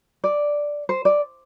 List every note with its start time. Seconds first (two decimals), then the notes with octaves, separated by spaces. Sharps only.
0.24 D5
0.89 C5
1.05 D5